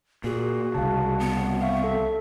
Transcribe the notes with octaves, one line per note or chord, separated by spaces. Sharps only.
A#2 F#4 G#4
C2 C#3 F5 A5
B3
E5 F5 C#6
A4